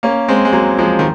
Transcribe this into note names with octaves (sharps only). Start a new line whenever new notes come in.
A#3 C#4
G#3 C4
G#3
F#3 A#3
F3 G#3
D#3